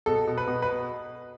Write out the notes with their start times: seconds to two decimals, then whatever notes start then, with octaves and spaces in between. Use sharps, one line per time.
0.06 B2 A4
0.27 B2
0.38 B4
0.47 B2
0.62 B4